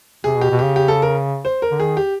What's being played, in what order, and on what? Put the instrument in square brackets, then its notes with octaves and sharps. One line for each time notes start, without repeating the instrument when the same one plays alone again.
[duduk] C3 [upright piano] G#4
[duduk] B2 [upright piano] G4
[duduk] B2
[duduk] C#3 [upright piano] G4
[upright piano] G4
A4
A#4
C5
A#4
[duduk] D3
[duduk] D#3 [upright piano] G#4
[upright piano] G4